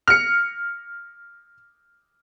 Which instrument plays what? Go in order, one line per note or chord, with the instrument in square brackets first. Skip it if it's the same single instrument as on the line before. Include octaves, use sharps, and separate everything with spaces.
[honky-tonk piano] F6 C#7